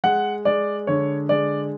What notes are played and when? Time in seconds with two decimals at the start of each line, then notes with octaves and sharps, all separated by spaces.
0.04 G#3 F#5
0.45 G#3 D5
0.87 D3 C#5
1.29 G#3 D5